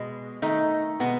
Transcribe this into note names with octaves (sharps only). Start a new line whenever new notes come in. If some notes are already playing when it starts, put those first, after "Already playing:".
Already playing: B2 G#3
D#3 A3 D#4
B2 G#3 B3